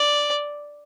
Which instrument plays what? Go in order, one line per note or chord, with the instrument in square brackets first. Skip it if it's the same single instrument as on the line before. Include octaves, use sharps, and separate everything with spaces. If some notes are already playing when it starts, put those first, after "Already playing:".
Already playing: [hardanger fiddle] D5